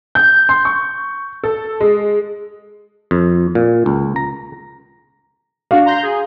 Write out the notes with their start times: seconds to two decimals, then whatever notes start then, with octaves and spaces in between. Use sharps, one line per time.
0.15 G6
0.49 C6
0.65 C#6
1.44 A4
1.80 G#3
3.11 F2
3.55 A#2
3.86 C#2
4.16 A#5
5.71 D4 F#4 F5
5.86 A#5 C6 G6
6.03 G#4